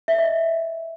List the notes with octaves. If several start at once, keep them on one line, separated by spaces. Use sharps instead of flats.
E5
D#5